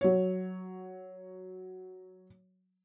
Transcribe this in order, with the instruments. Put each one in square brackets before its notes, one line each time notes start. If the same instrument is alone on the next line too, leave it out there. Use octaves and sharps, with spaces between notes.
[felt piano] F#3 C#5